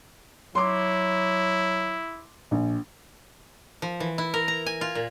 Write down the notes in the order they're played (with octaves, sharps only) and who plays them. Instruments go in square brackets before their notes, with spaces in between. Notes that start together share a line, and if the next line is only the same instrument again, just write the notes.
[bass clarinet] F#3 [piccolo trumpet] E4 [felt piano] C6 D6
[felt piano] A#1
[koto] F3
E3
E4
A#4
A#5
G#5
F4
A#2